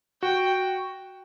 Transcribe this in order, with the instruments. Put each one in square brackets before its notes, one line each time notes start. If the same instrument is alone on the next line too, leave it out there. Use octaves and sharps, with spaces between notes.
[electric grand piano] F#4 [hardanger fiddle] G5